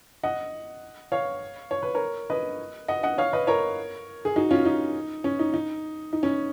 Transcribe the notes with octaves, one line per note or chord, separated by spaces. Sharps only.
D#5 F#5
C#5 F5
C#5
B4
A#4 C#5
B4 D#5
D#5 F#5
D#5 F#5
C#5 F5
B4 D#5
A#4 C#5
G#4
D#4 F#4
C#4 F4
D#4
C#4
D#4
D#4
D#4
C#4